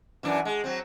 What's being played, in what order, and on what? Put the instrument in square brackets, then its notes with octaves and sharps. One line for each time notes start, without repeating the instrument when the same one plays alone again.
[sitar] F#2 E3 D4
G#3
F#3 C4